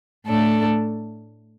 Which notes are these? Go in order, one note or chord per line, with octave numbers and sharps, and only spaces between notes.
A2 A3 D4 A4